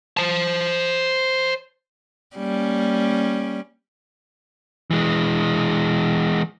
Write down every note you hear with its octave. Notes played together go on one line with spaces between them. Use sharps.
C5 A5
G3 A#3 C#4
E3 G#3